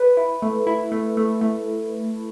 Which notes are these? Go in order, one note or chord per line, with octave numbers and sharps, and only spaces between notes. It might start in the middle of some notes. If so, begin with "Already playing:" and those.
Already playing: B4
E4
A3
E4
A3
A3
A3